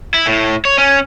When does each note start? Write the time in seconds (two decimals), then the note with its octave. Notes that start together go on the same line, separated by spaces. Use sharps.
0.14 E4
0.27 A2
0.65 C#5
0.78 C#4